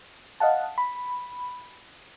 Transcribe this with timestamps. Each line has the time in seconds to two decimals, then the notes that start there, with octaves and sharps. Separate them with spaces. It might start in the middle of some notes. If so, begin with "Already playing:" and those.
0.40 D#5 F5 F#5 A5
0.78 B5